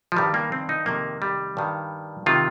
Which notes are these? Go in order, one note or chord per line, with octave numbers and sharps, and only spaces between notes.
F3
G2 D#3 G3
A#3
C4
D#4
F2 C3 D#3 A#3
G3
G2 D#3
C3 D#3 F4